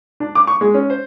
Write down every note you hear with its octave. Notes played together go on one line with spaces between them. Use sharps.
D4
D6
C#6
G#3
C#4
C5